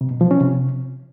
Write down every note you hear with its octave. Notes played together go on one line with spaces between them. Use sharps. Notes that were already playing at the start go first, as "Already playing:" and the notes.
C3
B2
F3
C#4
C3